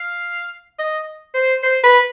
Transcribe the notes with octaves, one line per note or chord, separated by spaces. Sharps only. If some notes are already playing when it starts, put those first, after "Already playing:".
Already playing: F5
D#5
C5
C5
B4